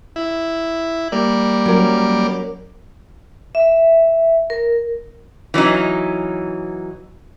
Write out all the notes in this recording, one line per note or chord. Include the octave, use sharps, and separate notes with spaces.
E4
G3 A#3 D5
F#3 C#4 A#4
E5
A#4
E3 F#3 C#4 D#4